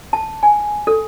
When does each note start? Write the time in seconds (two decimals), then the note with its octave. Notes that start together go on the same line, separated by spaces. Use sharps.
0.13 A5
0.43 G#5
0.87 A4